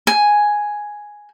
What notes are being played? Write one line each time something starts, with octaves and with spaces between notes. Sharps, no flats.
G#5